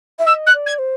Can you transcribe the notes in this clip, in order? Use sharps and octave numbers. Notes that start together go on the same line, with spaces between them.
E5
D#5 E6
F#6
D5
G#6
C5